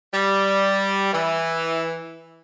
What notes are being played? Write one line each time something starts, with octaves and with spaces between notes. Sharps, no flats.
G3
E3